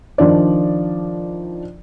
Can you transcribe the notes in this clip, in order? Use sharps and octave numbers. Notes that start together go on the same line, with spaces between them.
D#3 F3 D4 D5